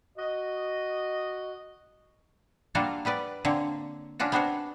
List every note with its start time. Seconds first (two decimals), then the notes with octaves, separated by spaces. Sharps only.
0.18 F#4 D#5
2.75 G3 A#3 D4 F4 F#4 A4
3.05 G3 B3 B4 D5
3.45 D3 A#3 C4 C#5
4.20 C#4 D4 F4 F#4
4.32 B3 C4 D4 F#4 C5 C#5